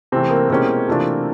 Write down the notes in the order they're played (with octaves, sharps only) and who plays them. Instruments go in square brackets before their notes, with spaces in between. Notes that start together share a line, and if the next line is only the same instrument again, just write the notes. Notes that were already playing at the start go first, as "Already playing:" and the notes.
[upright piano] C3 E3 A3 [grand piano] C4
[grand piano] A#3
[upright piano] B2 G#3 C#4 E4 G4 [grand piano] A#3
[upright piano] C3 E3 A3 D4 F4